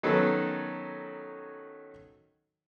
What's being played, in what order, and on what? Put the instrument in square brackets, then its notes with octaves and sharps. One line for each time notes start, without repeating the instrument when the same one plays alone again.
[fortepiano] D#3 F#3 B3 C#4 A4